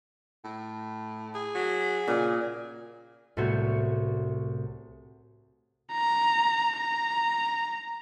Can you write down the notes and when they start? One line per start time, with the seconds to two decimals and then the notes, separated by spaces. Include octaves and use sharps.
0.44 A2
1.35 G#4
1.55 F#3
2.08 A#2 C#3
3.37 C2 A2 A3 B3 F#4 C#5
5.92 A#5
6.78 A#5